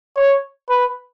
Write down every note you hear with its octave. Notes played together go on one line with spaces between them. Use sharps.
C#5
B4